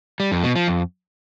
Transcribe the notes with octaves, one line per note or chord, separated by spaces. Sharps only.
G3
F2
B2
F3
F2